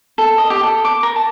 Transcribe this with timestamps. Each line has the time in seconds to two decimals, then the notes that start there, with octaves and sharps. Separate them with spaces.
0.18 A4
0.38 D#5
0.50 G4
0.63 A4
0.85 D6
1.03 A#4
1.16 A5